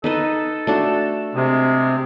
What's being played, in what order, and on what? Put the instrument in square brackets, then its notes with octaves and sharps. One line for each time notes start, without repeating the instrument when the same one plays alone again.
[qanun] D#4 B4 D#5 [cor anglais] A4
[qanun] A3 D4 F#4
[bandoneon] C3 [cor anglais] G#3